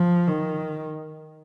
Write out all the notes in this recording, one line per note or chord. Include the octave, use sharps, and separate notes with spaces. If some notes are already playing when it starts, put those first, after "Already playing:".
Already playing: F3
D#3